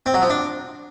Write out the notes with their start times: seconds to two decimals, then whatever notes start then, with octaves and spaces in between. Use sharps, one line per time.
0.06 C4
0.14 F#3
0.22 F3
0.30 D4